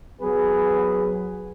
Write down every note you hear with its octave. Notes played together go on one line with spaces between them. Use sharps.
F#3 B3 G#4 B4